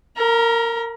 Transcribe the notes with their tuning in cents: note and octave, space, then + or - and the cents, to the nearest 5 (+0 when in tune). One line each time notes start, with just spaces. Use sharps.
A#4 -20 A#5 +35